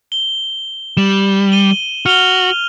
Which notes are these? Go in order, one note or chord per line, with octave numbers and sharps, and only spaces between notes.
G7
G3 E7 F#7
D#7 G7
F#4 F6 F7 G7